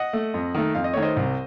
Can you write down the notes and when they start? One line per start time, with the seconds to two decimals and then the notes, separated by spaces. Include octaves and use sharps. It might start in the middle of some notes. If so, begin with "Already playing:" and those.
Already playing: D#5 F#5
0.13 A3
0.34 F2
0.54 D#3 A3
0.75 F2 F5
0.84 D#5
0.94 D#3 A3 C#5
1.02 C5 D#5
1.16 C2